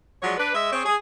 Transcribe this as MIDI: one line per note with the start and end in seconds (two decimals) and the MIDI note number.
0.23 0.36 53
0.23 0.36 54
0.23 0.36 56
0.23 0.36 73
0.23 0.36 74
0.38 0.50 62
0.38 0.50 71
0.54 0.69 56
0.54 0.69 75
0.54 0.69 76
0.72 0.82 60
0.72 0.82 68
0.72 0.82 73
0.85 0.95 68